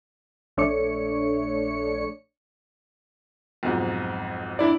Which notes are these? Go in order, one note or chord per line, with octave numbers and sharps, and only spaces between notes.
A#1 A3 D4 C#5 D5 C#7
B1 F2 G#2
D4 E4 D5